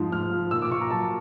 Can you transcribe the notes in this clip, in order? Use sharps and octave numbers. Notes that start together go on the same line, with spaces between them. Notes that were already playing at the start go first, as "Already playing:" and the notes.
Already playing: G#2 F3
G#2 F6
F3
A#2 E6
D6
A#2 C#6
A#5
F#3 A5